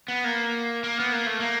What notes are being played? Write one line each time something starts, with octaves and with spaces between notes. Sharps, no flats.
B3
A#3
A#3
B3
A#3
A3
A#3